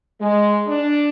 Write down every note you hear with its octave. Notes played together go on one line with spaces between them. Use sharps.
G#3
D4